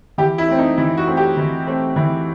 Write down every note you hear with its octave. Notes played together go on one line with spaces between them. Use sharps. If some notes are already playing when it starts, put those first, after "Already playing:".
E3 G4
E4
A3 C4
D#4
E3 E4
F#4
A3 C4
G4
E3
A3 C4
E3